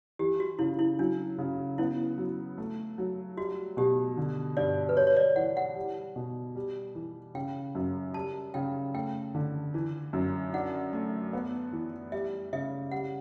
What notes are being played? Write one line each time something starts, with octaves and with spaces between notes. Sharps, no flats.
E3 G4
F#4
C#3 E4
E4
F#3 D4
C#3
B3 E4
F#3
A3
F#3
G3 F#4
B2 G4
D3
G2 D5
B4
G3 C#5
C#5
D5
E3 F#5
F#5
G3
B2
G3
E3
C#3 G5
F#2
G3 A5
C#3 G5
A3 G5
D3
E3
F#2
D4 F#5
A3
B3
E3
G3 E5
C#3 E5
G3 F#5